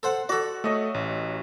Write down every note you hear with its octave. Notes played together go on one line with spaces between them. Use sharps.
A4 C5 F#5
F#4 A4 D5
A3 C#5 D#5 E5
A1